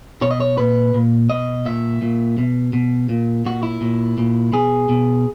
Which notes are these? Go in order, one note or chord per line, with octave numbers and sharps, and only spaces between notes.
B2 C#5
D#5
C#5
A#2 B4
A#2
B2 D#5
A#2 E5
A#2
B2
B2
A#2
A#2 F#4
E4
A#2
A#2
B2 G#4
B2